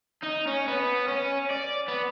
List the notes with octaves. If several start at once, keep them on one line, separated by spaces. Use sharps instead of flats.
D#4
C#4
B3
C#4
D5
B3